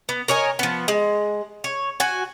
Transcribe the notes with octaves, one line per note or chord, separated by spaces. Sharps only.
B3
A#4 C#5 D#5 G#5
F3 B3
G#3
C#5
F#4 G#5